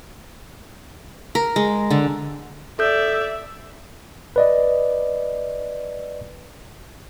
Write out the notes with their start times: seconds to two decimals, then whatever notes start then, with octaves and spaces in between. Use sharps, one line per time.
1.35 A#4
1.56 G#3
1.90 D3
2.79 A4 D5 E5 G6
4.36 B4 D5 D#5